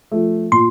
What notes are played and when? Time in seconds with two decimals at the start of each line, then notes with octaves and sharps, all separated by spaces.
0.12 F3 A3
0.52 A#2 C6